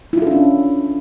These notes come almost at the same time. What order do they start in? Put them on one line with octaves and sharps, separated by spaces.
E4 F4 A4 D4 C#4